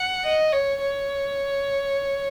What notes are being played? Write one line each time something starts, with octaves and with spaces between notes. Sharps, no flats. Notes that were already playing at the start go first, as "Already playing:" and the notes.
Already playing: F#5
D#5
C#5
C#5